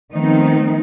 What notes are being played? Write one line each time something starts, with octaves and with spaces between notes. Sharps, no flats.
D#3 F3 A3 B3 C4 D#4